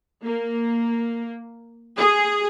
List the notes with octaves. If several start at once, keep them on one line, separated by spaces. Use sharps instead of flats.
A#3
G#4